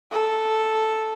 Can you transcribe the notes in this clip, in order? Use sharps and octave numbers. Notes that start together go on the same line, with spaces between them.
A4